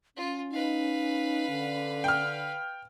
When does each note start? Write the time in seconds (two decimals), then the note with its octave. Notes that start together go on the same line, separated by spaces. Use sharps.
0.16 C#4 F4
0.52 D#4 B4 F5
1.49 D3
2.04 G5 F6